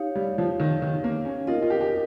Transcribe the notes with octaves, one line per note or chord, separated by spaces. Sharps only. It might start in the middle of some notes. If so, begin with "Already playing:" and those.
Already playing: D#4 G4 C#5 F5
G3
F3
D#3
D#3
A#3
C#4
D#4 F4 A#4 D#5
F4
G4
G4